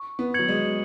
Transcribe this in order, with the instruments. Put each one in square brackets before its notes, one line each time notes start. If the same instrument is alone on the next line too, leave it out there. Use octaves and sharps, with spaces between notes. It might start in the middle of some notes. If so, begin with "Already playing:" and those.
Already playing: [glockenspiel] C#6
[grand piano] B3
[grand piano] F#3 [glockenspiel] G#6 C#7 F#7
[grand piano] G#3